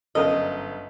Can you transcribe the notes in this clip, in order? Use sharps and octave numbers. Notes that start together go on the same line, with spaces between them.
G1 F#2 A4 A#4 D#5 F5